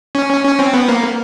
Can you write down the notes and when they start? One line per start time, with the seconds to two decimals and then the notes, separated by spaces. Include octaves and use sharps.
0.15 C#4
0.44 C#4
0.59 C4
0.74 B3
0.88 A#3